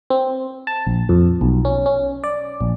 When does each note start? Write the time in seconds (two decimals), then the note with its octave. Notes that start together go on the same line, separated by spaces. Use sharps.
0.10 C4
0.67 A5
0.87 A#1
1.09 F2
1.41 B1
1.65 C#4
1.86 C#4
2.24 D5
2.61 A#1